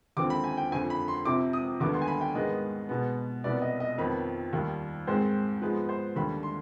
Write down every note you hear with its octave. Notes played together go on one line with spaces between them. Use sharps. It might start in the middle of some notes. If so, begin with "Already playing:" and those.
D#2 D3 F3 C4 D6
B5
G#5
G5
F2 D3 F3 G#5
B5
C6
F2 C3 F3 D6
D#6
D#2 D3 G3 B3 D6
C6
G#5
B5
G5
G#2 D#3 G#3 B3 D#5
B2 G#3 B3
C2 B2 B3 D5
D#5
D#5
F2 D#3 B3 B5
D#2 D#3 G3
G#2 D#3 G#3 C4 C5
G#2 F3 G#3 B3 B4
C5
D#2 D3 G3 B5
C6